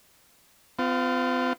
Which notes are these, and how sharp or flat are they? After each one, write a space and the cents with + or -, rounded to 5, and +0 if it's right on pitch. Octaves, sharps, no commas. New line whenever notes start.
C4 -45 F4 +0